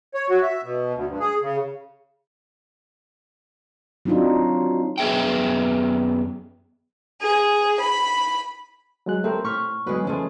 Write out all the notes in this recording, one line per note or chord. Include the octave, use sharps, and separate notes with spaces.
C#5
F#4
E5
B2
D2
G2
G#4
C#3
F#3 C4 D4 D#4 F4
F#2 B3 G#4 E5 G5
G#4
B5
F#3 G#3 F#6
A3 C4 G4 A#4
A2 C#6 F6 B6
A2 F#3 G#3 B3 B4
F3 G#3 A3 C#4